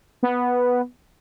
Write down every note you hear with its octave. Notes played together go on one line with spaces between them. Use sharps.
B3